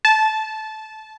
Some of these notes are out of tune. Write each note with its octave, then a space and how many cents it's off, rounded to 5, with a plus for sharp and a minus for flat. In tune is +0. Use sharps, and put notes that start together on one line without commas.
A5 -15